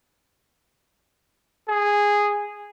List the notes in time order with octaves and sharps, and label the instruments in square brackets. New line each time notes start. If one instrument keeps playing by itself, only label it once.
[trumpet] G#4